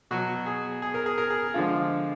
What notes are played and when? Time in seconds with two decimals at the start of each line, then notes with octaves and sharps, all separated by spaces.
0.11 B2 F#3 F#4
0.46 G#4
0.82 G#4
0.94 A#4
1.06 G#4
1.18 A#4
1.30 G#4
1.54 D3 F3 G#3 F4